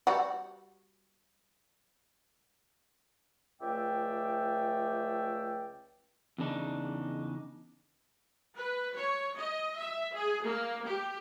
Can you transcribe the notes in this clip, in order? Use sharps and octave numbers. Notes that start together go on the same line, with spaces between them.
G3 F#4
C#2 F3 A3 D5 E5 G5
E2 C#3 D4 D#4
B4
C#5
D#5
E5
G#4
A#3
G4